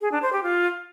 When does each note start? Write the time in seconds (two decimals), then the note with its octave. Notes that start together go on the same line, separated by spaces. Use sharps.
0.01 G#4
0.12 D4
0.22 C5
0.33 G4
0.43 F4